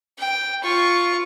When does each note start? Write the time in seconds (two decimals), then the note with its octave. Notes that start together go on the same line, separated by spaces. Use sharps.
0.18 G5
0.62 F4 C#6